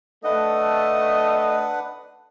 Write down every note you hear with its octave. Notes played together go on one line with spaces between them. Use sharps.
A3 D4 B4 D#5 F#5